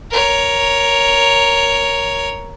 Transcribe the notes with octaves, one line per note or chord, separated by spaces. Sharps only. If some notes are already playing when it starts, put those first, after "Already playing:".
A#4 C#5